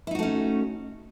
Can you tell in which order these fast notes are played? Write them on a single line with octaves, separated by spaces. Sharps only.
E4 D#4 F#4 A3 C#4